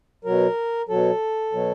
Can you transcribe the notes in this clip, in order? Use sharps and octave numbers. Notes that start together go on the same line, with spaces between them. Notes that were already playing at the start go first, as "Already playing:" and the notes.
B2 F#3 A#4
B2 F#3 A4
B2 F#3